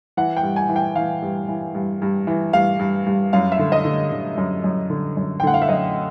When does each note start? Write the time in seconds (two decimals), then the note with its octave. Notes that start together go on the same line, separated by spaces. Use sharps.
0.17 E3 F#5
0.37 G5
0.43 G2
0.56 G#5
0.69 E3
0.76 G5
0.96 E3 F5
1.22 G2
1.48 E3
1.75 G2
2.02 G2
2.27 E3
2.53 G2 F5
2.79 G2
3.06 G2
3.33 F#2 F5
3.52 E5
3.59 D3
3.72 D#5
3.85 D3
4.12 D3
4.37 F#2
4.64 F#2
4.90 D3
5.17 F#2
5.40 G5
5.43 D3 F#5
5.54 F5
5.62 E5
5.69 F#2 D#5